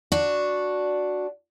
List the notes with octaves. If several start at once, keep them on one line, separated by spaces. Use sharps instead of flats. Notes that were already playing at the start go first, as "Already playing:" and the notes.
D4 F#4